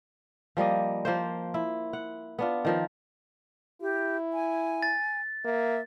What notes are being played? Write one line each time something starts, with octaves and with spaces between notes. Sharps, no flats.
F3 G3 A#3 D#5
F3 A#3 C5
E4
F#5
B3 D4 F4
D#3 F3 A#4
E4 G4
G#5
A6
A#3 E5